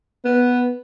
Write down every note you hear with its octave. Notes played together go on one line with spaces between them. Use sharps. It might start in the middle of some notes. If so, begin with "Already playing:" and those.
B3